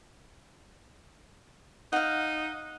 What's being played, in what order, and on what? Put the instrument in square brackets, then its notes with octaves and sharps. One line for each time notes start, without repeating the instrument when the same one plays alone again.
[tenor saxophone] D#4 [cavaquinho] F5 F#5